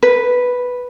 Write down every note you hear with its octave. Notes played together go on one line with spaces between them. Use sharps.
B4